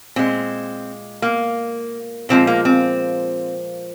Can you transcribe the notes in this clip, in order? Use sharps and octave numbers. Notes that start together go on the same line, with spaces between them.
A#2 G#3 C4
A#3
A#2 F3 G#3 C4
A#3
C4